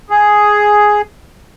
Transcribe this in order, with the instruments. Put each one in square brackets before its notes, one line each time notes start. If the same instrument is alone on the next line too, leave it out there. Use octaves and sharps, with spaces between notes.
[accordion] G#4